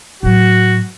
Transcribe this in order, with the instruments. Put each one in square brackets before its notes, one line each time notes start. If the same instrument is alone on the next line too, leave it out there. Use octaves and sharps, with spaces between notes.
[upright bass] A2 F#3 [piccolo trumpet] F#4